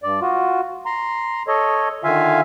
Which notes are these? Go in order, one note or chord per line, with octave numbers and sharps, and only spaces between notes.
G2 D5
F4 F#4
A#5 C6
A4 C#5 D#5
D3 D#3 F4 E5 F5 G#5